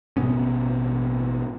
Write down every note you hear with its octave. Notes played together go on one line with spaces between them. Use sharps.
A1 B2 B3 C#4